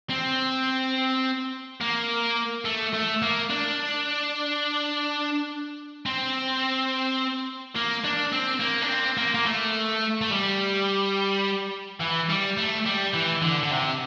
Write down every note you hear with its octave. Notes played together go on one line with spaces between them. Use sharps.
C4
A#3
A3
A3
A#3
D4
C4
A#3
D4
C4
A#3
D4
C4
A#3
A#3
A3
A3
G3
E3
G3
A3
G3
E3
D3
D3
C3